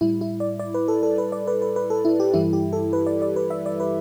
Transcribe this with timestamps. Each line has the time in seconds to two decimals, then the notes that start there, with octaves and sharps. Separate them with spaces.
0.01 A2 G3 E4
0.21 E4
0.40 D5
0.59 D5
0.74 B4
0.88 A4
1.03 A4
1.18 B4
1.32 D5
1.47 B4
1.62 B4
1.76 B4
1.90 A4
2.05 E4
2.20 G4
2.34 G2 E3 G3 E4
2.53 G4
2.73 A4
2.93 B4
3.07 D5
3.22 D5
3.36 B4
3.50 E5
3.66 D5
3.80 B4